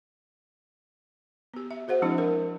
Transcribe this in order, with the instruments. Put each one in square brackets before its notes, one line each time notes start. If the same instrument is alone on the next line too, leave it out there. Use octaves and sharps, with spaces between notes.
[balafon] B3 G4
E5
F#4 G#4 C5 F#5
F3 G#3 C4 D4 E4 E5
A#4